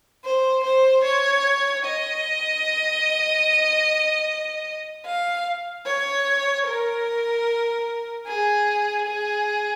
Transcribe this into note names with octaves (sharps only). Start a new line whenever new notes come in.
C5
C5
C#5
D#5
F5
C#5
A#4
G#4
G#4